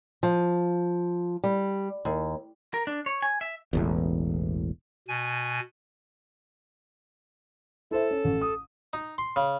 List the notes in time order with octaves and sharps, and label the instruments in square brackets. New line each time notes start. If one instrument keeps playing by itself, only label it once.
[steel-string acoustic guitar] F3
G3
D#2
[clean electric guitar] A#4
D4
C#5
G#5
E5
[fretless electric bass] E1 A1 E2
[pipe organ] B2 G#5
[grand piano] E4 C5 E5 [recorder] A4
[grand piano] C#4
A1
D#6
[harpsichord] D#4
C6
C#3